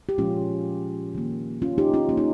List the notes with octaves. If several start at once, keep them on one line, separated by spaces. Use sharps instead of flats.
G4
A#2 F3 G#3 C#4 F4
D#3 A#3
C#4 F4
D#4 G4
C#4 F4
C#3 G3 A#3 C#4
D#4